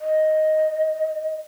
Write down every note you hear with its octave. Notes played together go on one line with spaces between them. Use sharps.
D#5